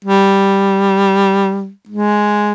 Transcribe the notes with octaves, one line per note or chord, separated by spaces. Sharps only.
G3
G#3